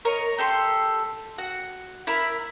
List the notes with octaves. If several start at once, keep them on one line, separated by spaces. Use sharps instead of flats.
A#4 C#5 D#5
G4 A4 C6
F#4 F#5
E4 A#4 B5